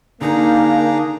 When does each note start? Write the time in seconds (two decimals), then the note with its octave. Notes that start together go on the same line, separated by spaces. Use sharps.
0.21 D3 A#3 D4 D#4 G#4 A#5